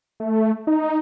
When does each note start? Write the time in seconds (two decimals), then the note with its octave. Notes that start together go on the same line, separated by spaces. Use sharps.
0.20 A3
0.67 D#4